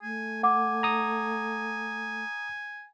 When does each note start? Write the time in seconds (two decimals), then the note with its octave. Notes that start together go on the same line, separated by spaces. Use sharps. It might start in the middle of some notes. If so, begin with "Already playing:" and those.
0.02 A3 G#5
0.43 F#5 G#5 D6
0.83 A#5 D#6